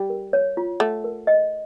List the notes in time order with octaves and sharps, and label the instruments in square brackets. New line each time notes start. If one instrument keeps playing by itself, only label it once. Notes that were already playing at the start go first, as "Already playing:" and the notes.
Already playing: [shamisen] G3
[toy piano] A#4
C#5
F4
[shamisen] A3 [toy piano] F#5
[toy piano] A#4
D#5